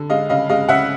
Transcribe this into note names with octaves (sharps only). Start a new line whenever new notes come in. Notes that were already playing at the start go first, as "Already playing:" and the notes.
Already playing: D3
G#3 D#5 F5
C#3 D#5 F5
G#3 D#5 F5
C#3 E5 F#5